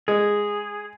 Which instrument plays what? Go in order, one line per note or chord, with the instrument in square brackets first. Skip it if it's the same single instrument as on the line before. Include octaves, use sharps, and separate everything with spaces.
[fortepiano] G#3 [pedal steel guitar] G#4